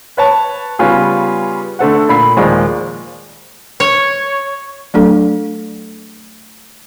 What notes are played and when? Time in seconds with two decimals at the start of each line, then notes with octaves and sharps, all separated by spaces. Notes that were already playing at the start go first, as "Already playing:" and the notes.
0.17 B4 C#5 A5
0.79 C#3 G3 B3 C#4 F4 G#4
1.79 D3 A3 A4 F#5
2.09 A#2 B5 C7
2.37 D#2 A#2 F3 G#3 G#4 D5
3.80 C#5
4.94 F#3 A3 D4 A4